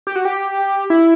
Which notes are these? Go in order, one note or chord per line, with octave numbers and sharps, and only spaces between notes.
G4
F#4
G4
E4